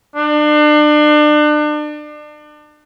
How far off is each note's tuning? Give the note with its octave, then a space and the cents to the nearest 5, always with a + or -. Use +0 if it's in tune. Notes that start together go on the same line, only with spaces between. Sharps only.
D4 +35